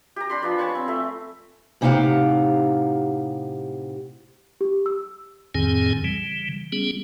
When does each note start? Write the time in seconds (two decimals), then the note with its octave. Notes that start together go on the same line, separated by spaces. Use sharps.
0.16 G4 A#5
0.30 D4 B5 C6
0.42 F3 B3 D5
0.58 C#5 G#5 A5 C#6
0.75 C4
0.88 A3 E5
1.81 A2 C3 D#4 G4 F5 F#5
4.61 G4
4.86 E6
5.55 F2 A2 D#3 C4 G#4 G#5
6.04 C#3 E3 G3
6.72 G3 B3 C#4 G#4